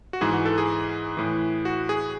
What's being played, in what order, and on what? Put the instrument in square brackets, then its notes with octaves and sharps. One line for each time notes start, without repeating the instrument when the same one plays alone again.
[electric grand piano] F#4
G#2 E3 G#4
F#4
A4
G#4
A2 E3
F#4
G#4